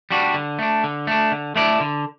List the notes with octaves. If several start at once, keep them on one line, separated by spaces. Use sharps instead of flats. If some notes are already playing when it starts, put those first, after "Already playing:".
G3 D4 F#4
D3
A3 D4
D3
A3 D4
D3
A3 E4 A4 D5
D3